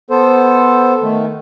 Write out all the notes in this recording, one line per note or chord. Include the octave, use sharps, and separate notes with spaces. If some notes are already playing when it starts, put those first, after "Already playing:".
B3 A4 C5
D#3 A3